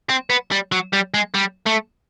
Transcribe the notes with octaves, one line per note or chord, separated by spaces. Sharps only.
C4
B3
G3
F#3
G3
G#3
G3
A3